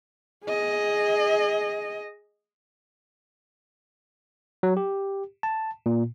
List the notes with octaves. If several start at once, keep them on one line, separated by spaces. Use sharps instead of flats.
G#4 D#5
F#3
G4
A5
A#2